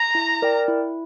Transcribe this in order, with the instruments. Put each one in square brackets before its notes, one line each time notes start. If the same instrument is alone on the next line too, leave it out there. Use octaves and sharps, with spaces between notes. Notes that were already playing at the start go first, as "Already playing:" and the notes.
Already playing: [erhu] A#5
[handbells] E4
A#4 D5 G5
E4